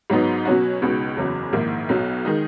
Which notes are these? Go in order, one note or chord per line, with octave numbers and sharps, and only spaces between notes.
G#2 F#3 B3 D#4
B2 F#3 C#4 F#4
C#2 B2 G#3 D#4 F#4
F#1 E2 C#3 F#3
A#1 G#2 D#3 A#3 E4
B1 B2 F#3
D#3 G#3 D#4